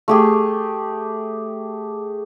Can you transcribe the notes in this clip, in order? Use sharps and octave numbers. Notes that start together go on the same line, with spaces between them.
A3 G4 G#4